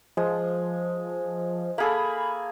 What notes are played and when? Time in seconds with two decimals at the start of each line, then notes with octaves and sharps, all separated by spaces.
0.17 F3 G#3
1.78 A#3 G#4 A4 B5